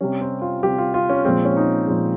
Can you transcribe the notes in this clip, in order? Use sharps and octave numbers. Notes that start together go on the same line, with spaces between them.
C3 G3 C#4
C4
F4
C3 G3 G4
F4
F4
C#4
A#2 F3 G#3 C4
C#4
D#4
A#2 F3 G#3